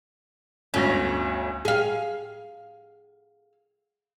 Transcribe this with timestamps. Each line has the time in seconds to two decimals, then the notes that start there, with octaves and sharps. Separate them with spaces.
0.74 G1 D2 C#4 A#6
1.65 G#4 F5